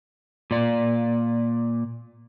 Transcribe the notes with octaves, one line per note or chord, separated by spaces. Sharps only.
A#2 D5